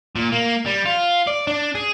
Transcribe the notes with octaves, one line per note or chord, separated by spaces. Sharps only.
A#2
A#3
G3
F4
D5
D4
G#4